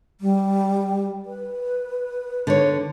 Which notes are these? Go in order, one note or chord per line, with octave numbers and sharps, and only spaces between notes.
G3
B4
D3 C#5